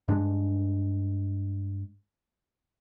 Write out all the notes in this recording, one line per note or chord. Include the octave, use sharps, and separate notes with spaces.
G2 G#3 D4